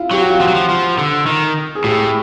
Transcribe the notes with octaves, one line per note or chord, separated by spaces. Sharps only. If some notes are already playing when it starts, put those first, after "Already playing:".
Already playing: E4 F4
F#3 G4
F#4
F4
F3 F#4
F#3
F3
F3
D3
D#3
G#4
A2 G4